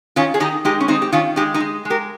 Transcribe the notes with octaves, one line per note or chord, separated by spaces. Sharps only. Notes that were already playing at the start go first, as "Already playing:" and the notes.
D#3 C#4 F4
G#4
D#3 D#4 G4
G#3 D#4 G4
C#4
D#3 C4 D#4
G4
D#3 C#4 F4
G#3 D#4 G4
D#4 G4
G#3
G#3
G4 A#4